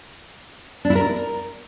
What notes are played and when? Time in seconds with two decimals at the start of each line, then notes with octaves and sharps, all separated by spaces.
0.85 D4
0.90 E4
0.95 A#4